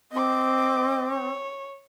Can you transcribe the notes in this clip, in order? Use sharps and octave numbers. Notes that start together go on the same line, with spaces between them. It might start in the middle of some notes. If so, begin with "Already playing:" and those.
C4 D#5 D6
C#5